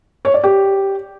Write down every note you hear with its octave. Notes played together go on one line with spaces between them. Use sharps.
C#5
D5
G4